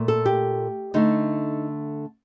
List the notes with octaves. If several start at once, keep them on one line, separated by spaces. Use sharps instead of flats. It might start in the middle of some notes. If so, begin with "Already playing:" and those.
Already playing: A#2 A3
A4
G4
D3 A3 D#4